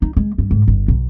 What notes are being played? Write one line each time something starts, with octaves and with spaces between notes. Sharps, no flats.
D#4
G#3
G2
G#2
G1
B1